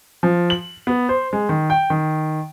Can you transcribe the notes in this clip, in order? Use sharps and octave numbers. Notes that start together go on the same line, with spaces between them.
F3
F#7
B3
C5
G#3
D#3
G5
D#3